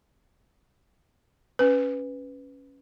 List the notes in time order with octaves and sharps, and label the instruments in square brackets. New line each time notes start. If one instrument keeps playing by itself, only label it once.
[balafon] C#4 B4